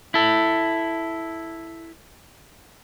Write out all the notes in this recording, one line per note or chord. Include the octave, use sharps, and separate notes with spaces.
E4 A4